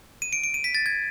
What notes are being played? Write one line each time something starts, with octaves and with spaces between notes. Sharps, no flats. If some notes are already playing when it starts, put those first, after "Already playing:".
D#7
D7
D7
D#7
B6
A6
G#6